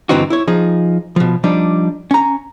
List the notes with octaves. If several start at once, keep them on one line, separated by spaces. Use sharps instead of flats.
G2 D3 E3 C4 D#4 F#4
E4 C#5
F3 D#4 G#4
B2 F3
F3 G3 D4 D#4
C#4 A#5